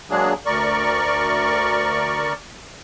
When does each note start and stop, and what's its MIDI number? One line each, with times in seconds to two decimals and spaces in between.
0.10 0.33 54
0.10 0.33 56
0.10 0.33 58
0.10 0.33 62
0.10 0.33 68
0.46 2.33 38
0.46 2.33 70
0.46 2.33 74
0.46 2.33 85